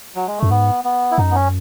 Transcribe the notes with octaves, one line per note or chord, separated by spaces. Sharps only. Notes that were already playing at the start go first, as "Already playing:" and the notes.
F#3
G#3
F#2 A3
G#2 B3
B3
E4
F#2 D#4
B3
C#4